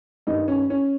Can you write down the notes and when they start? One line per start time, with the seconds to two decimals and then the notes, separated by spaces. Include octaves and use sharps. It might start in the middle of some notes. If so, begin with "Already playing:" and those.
0.27 G2 D#3 D#4
0.48 C#4
0.70 C#4